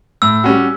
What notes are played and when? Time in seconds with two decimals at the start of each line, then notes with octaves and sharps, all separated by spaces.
0.22 A2 E6
0.44 G3 C#4 F#4